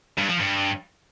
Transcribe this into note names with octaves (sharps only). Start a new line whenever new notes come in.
G2
F3
G2